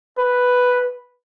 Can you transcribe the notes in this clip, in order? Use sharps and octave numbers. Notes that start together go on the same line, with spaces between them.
B4